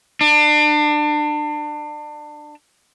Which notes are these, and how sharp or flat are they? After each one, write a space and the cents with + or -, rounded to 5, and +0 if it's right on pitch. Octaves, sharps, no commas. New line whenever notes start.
D4 +30